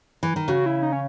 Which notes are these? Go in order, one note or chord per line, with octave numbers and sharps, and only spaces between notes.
E3
D#3
C#3 F#4
E4
D#4
C#4